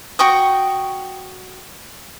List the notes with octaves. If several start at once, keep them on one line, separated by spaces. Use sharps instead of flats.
F#4 G5 C#6 D#6